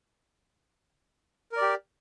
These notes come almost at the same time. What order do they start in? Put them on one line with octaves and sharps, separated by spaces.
A#4 D5 G4